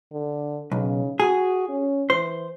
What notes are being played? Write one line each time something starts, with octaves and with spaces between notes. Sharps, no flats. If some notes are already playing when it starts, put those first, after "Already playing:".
D3
B1 C#3
F#4 G#4
C#4
E3 C5